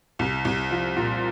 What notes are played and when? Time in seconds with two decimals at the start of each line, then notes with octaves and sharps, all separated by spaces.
0.19 C2
0.45 C2
0.71 F3
0.97 A#2